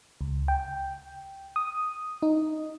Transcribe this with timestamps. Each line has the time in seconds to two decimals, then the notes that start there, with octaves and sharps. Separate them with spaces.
0.21 C#2
0.48 G5
1.56 D#6
2.22 D#4